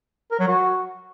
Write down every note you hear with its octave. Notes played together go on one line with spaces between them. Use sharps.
A#4
F#3
F#4